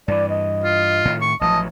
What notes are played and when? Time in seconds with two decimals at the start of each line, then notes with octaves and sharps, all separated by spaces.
0.08 G2 E3 D5
0.29 D#5
0.64 F4
1.05 A2 D#3
1.21 C#6
1.41 A1 F3 F#3 D#5 A5